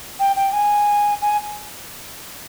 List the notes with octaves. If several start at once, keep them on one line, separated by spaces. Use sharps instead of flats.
G5
G5
G#5
G#5